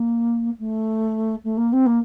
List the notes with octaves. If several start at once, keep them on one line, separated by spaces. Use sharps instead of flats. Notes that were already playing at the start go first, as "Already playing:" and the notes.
Already playing: A#3
A3
A3
A#3
C4
A#3